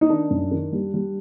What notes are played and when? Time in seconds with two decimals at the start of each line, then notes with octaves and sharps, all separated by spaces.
0.01 D#4
0.09 D#3 D4
0.31 F#2
0.51 D#3
0.73 G3
0.94 G3